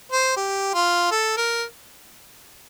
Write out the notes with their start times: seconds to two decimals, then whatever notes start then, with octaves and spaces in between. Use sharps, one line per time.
0.12 C5
0.37 G4
0.74 F4
1.11 A4
1.37 A#4